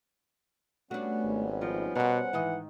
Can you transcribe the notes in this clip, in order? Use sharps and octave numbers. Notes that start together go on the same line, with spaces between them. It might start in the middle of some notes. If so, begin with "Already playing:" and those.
G3 A3 B3 C#4 D4 F#4
G#1
F3 D#4
B2 A#4 C5 F#5
G#2 D#3 E3 D#5